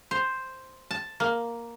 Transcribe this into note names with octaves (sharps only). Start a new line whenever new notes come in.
C5
A5
A#3